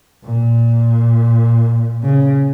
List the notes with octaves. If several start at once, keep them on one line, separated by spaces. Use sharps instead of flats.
A#2
C#3